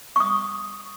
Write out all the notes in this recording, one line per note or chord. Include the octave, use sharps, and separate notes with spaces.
C#6 D#6